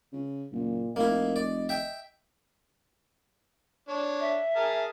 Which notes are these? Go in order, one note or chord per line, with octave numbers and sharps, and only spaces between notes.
C#3
F#1 A#2
F1 A#3 E4 D#5
D5
E5 G5
D4 C#5
E5
G#4 A#4 A5